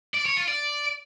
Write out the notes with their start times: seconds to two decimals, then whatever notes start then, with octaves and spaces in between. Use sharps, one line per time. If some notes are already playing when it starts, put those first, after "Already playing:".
0.14 D5
0.25 C#5
0.37 F4
0.48 D5